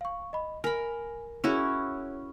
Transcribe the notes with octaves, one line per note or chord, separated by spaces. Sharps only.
F5 C#6
D#5 B5
A#4 G#5 B5
C#4 E4 F#4 G#4 C#5